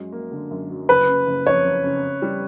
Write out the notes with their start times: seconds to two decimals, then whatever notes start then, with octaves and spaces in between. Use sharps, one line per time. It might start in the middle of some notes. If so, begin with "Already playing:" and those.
Already playing: F#2 F#3 G#3
0.12 A#3
0.32 D3
0.51 F#2
0.70 F#3
0.89 F#1 B4
1.08 C#3
1.27 F#1
1.46 F2 C#5
1.65 F#1
1.84 C#3
2.03 C#3
2.22 G3